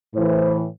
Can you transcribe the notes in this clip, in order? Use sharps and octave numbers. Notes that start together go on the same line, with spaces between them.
A2 E3 C5